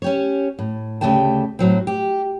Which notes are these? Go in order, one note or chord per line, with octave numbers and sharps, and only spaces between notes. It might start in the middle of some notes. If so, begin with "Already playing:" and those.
C#4 G4 C#5
A2
D2 C#3 A3 G4 G5 A5
A2 F#3 C4
G4